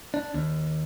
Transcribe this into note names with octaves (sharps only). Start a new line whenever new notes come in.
D4
D#2